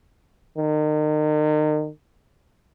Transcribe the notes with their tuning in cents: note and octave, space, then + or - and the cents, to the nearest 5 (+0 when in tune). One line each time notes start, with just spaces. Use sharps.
D#3 -35